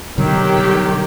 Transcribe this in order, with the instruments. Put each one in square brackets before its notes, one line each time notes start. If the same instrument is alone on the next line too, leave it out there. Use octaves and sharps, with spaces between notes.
[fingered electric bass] B2 D3 G3 [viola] D#3 G4 [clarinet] F#3